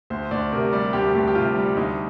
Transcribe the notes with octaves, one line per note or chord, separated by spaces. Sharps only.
D2 C5
D2 D5
C3 A#4
G3 D5
D2 G4
D2
G4
C3 F4
G3
D2 D#4